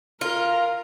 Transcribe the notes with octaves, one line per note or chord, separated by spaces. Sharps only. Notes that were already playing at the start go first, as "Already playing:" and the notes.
F4 A#4